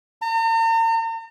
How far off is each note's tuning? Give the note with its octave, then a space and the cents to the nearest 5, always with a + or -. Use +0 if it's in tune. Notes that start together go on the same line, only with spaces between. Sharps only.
A#5 -45